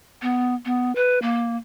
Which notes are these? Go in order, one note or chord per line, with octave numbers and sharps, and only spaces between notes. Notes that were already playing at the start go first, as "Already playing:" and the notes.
B3
B3
B4
A#3